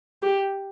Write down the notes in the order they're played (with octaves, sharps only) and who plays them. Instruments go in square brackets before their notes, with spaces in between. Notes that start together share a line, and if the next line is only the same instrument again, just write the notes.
[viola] G4